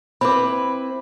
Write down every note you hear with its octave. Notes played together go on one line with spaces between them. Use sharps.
C4 E4 B4 B5 D6